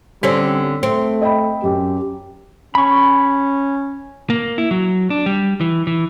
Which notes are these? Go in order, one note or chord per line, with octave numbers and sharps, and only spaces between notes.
D3 G3 C4 C#4 B6
A3 C4
D#5 G5 B5
F#2 G4
C#4 B5 C#6
A#3
E4
F#3
D4
G3
E3
E3